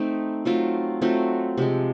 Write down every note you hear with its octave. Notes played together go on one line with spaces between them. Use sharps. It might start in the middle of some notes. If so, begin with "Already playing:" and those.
Already playing: A3 C4 D#4
F#3 A3 C4 F4
F#3 A3 C4 F4
C3 F3 G#3